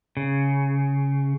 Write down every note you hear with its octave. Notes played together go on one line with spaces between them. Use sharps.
C#3